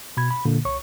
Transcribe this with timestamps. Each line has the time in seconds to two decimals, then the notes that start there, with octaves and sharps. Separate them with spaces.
0.17 B2 B5 G#6
0.31 B5
0.45 A#2 D3 A#3
0.65 C2 C#5 C#6